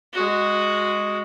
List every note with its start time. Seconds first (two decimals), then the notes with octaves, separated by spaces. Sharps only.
0.13 G#3 F#4